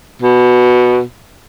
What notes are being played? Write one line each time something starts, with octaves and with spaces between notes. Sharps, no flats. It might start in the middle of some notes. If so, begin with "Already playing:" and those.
B2